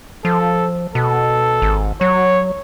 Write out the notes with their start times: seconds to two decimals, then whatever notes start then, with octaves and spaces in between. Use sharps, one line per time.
0.25 F3 A4
0.95 B2 A4
1.62 G#1
2.01 F#3 C#5